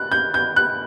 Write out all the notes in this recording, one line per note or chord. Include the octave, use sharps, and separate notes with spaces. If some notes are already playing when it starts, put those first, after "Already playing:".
Already playing: F#6
G6
G6
F#6